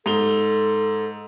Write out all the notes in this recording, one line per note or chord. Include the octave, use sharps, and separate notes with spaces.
G#2 A4 F7 G7